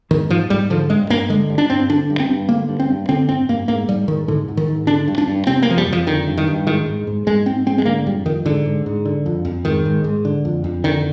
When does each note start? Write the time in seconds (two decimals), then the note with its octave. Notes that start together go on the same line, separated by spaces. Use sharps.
0.11 G#2 D#3
0.30 G#2 F3
0.50 G#2 G3
0.70 D3 F3
0.90 G2 G#3
1.10 G2 A#3
1.29 D3 G#3
1.50 G2
1.58 D4
1.70 G2 C4
1.89 D3 D4
2.10 G2
2.20 C4
2.29 G2
2.49 D3 A#3
2.69 G2
2.80 C4
2.89 G2
3.09 D3 C4
3.29 G2 C4
3.49 G2 A#3
3.68 G#2 A#3
3.88 G#2 G3
4.08 G#2 D#3
4.28 G#2 D3
4.48 G#2
4.57 D#3
4.68 G#2
4.87 D3 D4
5.08 G2
5.18 D4
5.27 G2
5.47 C3 C4
5.62 A#3
5.67 F2 F3
5.78 G3
5.87 F2
5.92 F3
6.06 D3 D#3
6.28 G2
6.37 D#3
6.47 G2
6.67 G#2 D#3
6.86 G#2
7.07 G#2
7.27 G#2 G#3
7.46 G#2 C4
7.66 G#2 C4
7.78 G#3
7.85 D3 A#3
8.06 F2 G3
8.25 F2 D#3
8.45 G#2 D3
8.65 G#2
8.86 G#2
9.05 D3
9.26 F2
9.45 F2
9.65 G#2 D#3
9.86 G#2
10.04 G#2
10.25 D3
10.45 F2
10.64 F2
10.84 D3 D#3